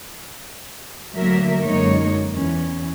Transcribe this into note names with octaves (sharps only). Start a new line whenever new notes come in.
D2 D3 F#3 A#3 A#4 E5
F#2 D3 G#3 A#3 D#4 C#5
E2 E3 C#4